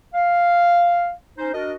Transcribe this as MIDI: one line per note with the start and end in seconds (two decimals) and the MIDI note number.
0.14 1.12 77
1.38 1.53 61
1.38 1.53 63
1.38 1.53 72
1.54 1.74 62
1.54 1.74 66
1.54 1.74 70
1.54 1.74 75